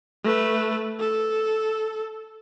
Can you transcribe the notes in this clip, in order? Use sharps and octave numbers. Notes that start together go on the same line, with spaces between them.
A3 B4
A4